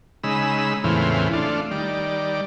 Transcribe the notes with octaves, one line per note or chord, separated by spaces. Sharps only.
C#3 G#3 D#4 B5 E6
E2 A2 C#3 E3 C4 F4
A3 D4 F4
D#3 G3 D5